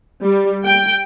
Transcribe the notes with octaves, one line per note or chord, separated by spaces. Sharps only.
G3
G5